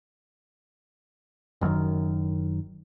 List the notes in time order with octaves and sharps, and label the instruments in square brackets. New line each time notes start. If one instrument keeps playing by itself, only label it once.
[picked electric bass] F#1 F#2 A2 D#3